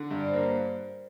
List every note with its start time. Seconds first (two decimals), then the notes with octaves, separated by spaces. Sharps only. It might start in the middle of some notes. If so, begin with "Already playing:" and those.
Already playing: D3
0.11 G2
0.21 D5
0.28 C5
0.33 A#3 A#4
0.43 C5